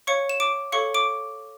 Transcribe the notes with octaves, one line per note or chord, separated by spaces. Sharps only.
C#5 F5 C#6 C#7
E7
D6 D7
A4 C#5 F5 C#6 C#7
D6 D7